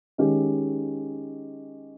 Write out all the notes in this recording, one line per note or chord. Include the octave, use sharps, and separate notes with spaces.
D#3 G#3 C#4 G4